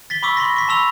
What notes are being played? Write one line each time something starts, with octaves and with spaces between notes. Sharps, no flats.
A6 B6 G7
B5 C#6 D6 E6 B6 G7
B5 C6 A#6
C#6 B6
A5 B5 C6 E6 F7